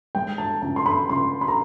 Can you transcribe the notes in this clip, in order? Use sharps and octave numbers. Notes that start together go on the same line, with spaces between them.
G#3 G5
A5
C#2 A5
C6
B5
C#2 C6
B5
A#5